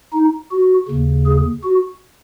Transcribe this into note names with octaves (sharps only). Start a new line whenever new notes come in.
D#4
F#4
D#2 C#3
G#4
F#4